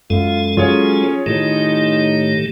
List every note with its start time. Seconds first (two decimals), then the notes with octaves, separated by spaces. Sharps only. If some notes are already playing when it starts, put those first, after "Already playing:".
0.10 F#2 G#3 F4 A4
0.57 F#3 C#4 F4 G#4 C#5
1.26 A2 D#3 A3 D#4 G4